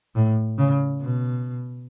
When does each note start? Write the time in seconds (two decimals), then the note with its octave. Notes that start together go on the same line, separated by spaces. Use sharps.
0.15 A2
0.58 C#3
1.01 B2